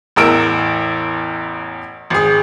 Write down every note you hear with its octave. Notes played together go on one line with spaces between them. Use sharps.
A1 E2 A#4 E6 D7
G#1 G#4